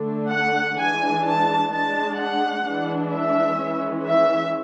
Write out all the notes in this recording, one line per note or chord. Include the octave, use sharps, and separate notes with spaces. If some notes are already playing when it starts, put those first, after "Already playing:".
Already playing: D3 A3 D4
F#5
E3 G#3 D4 G#5
A5
G#3 D4 A5
F#5
E3 G#3 D4
E5
E3 G#3 C#4
E5